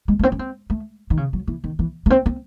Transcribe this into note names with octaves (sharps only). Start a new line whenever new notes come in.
G#3
A3
C4
C#4
C4
A3
D#3
C#3
F#3
E3
D#3
E3
A3
C4
C4